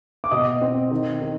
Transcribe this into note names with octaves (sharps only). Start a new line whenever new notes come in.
D6
B2 D#5 D#6
C4
D#3
D#3